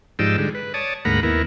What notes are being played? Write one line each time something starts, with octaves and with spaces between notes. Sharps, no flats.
G#2 F3 D#4 G4 D5 E6
D3 G3 G#3
B4
C#5 D5 A5 D#6
D2 G#2 A#3 F#5 A#5 B5
D#2 B3 E4 A#4